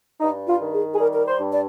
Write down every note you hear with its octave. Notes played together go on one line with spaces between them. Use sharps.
G2 D#4
F4
D#3
G#4
G#4
G3 A#4
A#4
C5
G2
D5